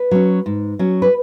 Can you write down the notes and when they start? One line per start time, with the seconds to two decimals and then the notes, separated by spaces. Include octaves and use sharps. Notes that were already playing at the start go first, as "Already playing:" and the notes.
Already playing: B4
0.11 F#3 C#4
0.46 G#2
0.79 F#3 C#4
1.02 B4